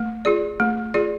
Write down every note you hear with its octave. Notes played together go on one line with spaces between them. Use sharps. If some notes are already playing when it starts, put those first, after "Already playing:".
Already playing: A3
F4 G#4 D5
A3
F4 G#4 D5